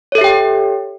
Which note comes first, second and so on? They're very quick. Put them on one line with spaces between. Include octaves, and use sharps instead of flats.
C#5 A4 E5 G4 G5